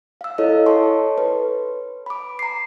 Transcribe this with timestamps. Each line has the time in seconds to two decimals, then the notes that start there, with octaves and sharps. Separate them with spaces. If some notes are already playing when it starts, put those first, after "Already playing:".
0.21 F5 E6
0.38 E4 A4 C#5 D#5
0.66 A4 C#5 A5 C6 C#6
1.18 B4
2.06 B5 D6
2.39 A#5 C7